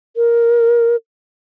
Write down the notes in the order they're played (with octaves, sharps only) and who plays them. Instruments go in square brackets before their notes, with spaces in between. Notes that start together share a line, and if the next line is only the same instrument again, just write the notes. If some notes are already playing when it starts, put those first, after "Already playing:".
[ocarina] A#4